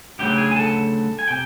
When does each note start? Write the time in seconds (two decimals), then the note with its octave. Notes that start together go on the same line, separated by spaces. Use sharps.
0.19 D2 C#3 F#3 G4 G5
0.37 G#4 G#5
0.51 G#5
0.56 A4 A5
1.19 G#5
1.28 C3 G5